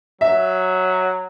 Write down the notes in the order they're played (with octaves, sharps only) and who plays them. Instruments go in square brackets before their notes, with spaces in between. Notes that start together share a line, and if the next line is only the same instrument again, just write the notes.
[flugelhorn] F#3 [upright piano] E5